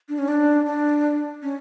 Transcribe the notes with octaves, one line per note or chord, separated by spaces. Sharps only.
D4
C#4
D4
D4
C#4